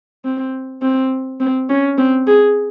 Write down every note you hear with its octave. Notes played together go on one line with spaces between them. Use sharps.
C4
C4
C4
C#4
C4
G#4